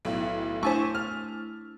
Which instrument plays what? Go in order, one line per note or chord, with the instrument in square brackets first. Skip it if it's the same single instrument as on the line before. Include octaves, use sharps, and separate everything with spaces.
[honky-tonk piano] B1 A2
[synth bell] A3 D4 E4 [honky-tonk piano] C5 G#5 C#6
[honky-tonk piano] F6